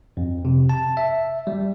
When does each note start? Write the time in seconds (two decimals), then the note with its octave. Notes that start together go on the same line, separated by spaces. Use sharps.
0.17 F2
0.45 C3
0.69 A5
0.97 E5
1.47 G3